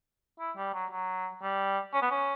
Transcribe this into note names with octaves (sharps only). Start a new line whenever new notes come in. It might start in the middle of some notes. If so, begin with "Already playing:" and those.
E4
G3
F#3
F#3
G3
C#4
B3
C#4